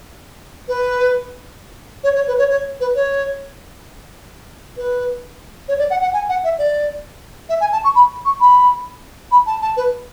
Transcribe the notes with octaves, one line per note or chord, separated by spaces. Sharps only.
B4
C#5
C#5
B4
C#5
C#5
B4
C#5
B4
C#5
D5
F#5
F#5
G#5
F#5
E5
D5
E5
G#5
A5
C#6
B5
C#6
B5
B5
A5
A5
B4